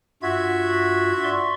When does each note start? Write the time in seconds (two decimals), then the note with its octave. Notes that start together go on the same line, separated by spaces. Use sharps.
0.23 G2 F4 F#4 E5 G#6
1.24 D5 C6 C#6